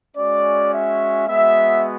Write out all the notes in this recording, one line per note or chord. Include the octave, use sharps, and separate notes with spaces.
G#3 C#4 F#4 D5
E5
G#3 B3 F#4 E5